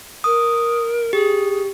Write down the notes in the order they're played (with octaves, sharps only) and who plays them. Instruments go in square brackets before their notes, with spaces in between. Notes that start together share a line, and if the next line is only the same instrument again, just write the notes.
[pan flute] A#4 [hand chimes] D#6
[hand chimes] G4 [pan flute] G#4